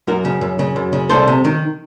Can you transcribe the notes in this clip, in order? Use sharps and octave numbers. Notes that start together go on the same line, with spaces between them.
F#2 F#4 A#4
C#3
F#2
C#3
F#2
C#3
C2 A4 C5
C3
D#3